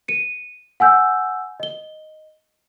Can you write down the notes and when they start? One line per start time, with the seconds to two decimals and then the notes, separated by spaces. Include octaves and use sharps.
0.08 C#7 D#7
0.80 F#5 G#5 E6 G6
1.60 D#5 G7